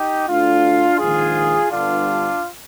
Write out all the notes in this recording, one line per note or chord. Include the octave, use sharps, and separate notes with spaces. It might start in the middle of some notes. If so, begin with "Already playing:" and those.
Already playing: D#4 G4
D2 D3 D4 F4
A#1 G#2 D#3 F4 G#4
G1 G2 D3 D4 F4